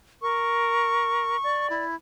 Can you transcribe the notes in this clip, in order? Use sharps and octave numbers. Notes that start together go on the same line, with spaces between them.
A#4 C#6
D5
E4